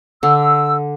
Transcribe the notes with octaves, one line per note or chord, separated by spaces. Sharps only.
D3 E6